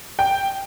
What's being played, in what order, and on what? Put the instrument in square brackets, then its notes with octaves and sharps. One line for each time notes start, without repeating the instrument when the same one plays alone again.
[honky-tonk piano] G5